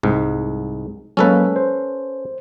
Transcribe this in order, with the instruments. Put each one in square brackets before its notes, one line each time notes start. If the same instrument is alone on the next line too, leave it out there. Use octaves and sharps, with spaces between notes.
[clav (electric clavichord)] C2 G#2
[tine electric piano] F#3 G#3 A#3 [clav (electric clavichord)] C#4 A4 B4
[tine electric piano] C5